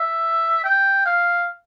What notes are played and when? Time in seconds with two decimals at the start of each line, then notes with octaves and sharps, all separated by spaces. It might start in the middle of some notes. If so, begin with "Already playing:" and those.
Already playing: E5
0.64 G5
1.05 F5